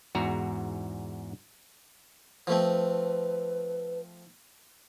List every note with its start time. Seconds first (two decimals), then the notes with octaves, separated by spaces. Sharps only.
0.15 E2 G#2 F#4 A#5
2.47 F3 A3 C4 B4